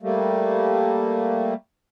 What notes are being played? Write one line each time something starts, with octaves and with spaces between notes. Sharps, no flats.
G3 A3 A#3